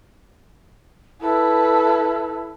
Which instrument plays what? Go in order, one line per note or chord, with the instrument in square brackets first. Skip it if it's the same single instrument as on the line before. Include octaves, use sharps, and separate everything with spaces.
[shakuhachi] E4 [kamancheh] A4 B4